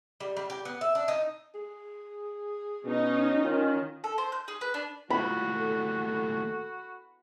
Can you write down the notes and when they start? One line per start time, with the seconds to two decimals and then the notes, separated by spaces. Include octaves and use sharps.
0.20 G3
0.37 G3
0.50 G4
0.65 B3
0.81 E5
0.95 D4
1.08 D#4
1.54 G#4
2.85 B2 C#4 D#4
3.43 D#3 C#4 F4
4.04 A4
4.18 C5
4.32 G6
4.48 G#4
4.61 B4
4.74 D4
5.10 D#2 A2 F4 F#4 B5
5.56 A4